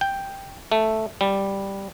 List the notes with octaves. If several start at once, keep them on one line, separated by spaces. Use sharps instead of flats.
G5
A3
G3